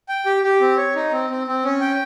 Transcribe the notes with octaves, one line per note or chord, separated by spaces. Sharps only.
G5
G4
G4
C4
C#5
D#4
C4
C4
C4
C#4
G5